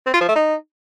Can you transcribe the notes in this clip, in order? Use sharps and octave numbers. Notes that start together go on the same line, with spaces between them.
C4
F4
F3
A3
D#4